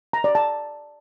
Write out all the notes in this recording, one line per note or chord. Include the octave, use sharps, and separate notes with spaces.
A#5
D5
A5